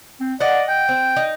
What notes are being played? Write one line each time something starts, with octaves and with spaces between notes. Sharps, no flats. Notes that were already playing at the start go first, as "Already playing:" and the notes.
C4
D5 D#5 F#5
G5
C4
D#4